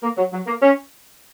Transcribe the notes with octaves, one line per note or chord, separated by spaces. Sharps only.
A#3
F#3
F#3
A#3
C#4